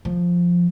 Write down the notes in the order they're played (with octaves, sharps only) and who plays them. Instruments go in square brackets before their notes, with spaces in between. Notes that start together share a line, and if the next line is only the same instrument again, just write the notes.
[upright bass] F3